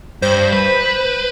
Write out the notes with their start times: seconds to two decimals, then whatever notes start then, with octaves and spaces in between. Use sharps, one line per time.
0.22 G2 C5
0.53 B4